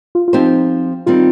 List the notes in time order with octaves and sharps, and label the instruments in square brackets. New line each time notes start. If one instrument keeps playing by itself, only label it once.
[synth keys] F4
F4
[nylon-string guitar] F3 C4 G4 C5 [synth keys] D#4
[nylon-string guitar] D#3 G3 C4 [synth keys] F4